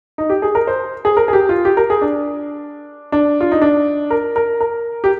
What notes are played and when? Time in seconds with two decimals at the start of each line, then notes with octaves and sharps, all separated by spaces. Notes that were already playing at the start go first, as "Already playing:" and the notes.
0.18 D#4
0.30 G4
0.42 G#4
0.55 A#4
0.67 C5
1.05 G#4
1.17 A#4
1.28 G#4
1.33 G4
1.49 F4
1.65 G4
1.77 A#4
1.90 G#4
2.01 D4
3.12 D4
3.41 F4
3.52 D#4
3.61 D4
4.10 A#4
4.36 A#4
4.61 A#4
5.04 G4